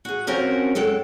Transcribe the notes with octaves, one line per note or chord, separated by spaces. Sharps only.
F#4 G#4
F3 C4 C#4 F#4 A#4 C#5
F#2 G#3 A4 G5